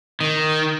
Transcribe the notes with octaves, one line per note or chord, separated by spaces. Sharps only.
D#3